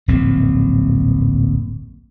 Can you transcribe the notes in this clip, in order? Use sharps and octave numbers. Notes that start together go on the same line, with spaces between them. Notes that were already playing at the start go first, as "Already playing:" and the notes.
D1 A#1 F#2 C4